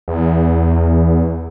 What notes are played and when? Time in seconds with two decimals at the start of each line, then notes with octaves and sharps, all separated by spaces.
0.08 E2